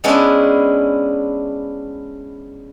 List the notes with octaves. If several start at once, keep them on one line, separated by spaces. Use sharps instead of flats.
G#3 B3 C#4 D4 E4 G#4